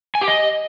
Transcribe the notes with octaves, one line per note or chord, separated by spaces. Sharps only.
G#5
G4
D#5